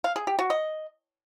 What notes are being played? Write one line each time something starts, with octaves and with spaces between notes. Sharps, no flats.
F5
G#4
G4
F#4
D#5